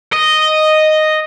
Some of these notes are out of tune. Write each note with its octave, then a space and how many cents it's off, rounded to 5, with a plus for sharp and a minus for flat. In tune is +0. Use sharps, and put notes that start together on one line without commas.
D#5 -5